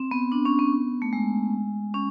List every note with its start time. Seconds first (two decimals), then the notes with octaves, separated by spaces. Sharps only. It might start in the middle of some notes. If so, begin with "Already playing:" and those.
Already playing: C4
0.11 B3
0.32 D4
0.45 C#4
0.59 B3
1.02 A3
1.13 G#3
1.94 C#4